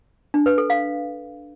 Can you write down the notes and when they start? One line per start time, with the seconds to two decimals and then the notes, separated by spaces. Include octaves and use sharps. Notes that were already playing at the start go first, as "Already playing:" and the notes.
0.34 D4
0.46 B4
0.58 A4
0.70 F5